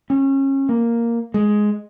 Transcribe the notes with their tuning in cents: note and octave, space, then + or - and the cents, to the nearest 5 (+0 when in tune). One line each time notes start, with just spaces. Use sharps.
C#4 -30
A#3 +0
G#3 +5